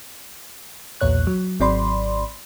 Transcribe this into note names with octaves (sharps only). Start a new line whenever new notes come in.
B1 E2 A#2 C#5 F#6
F#3
G#1 F#3 C4 D5 B5 C6